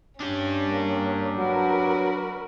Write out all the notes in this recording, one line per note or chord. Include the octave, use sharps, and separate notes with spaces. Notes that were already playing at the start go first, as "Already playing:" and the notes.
G2 C#4 D4 G4
A#3
F#3 F#4 A#4 B4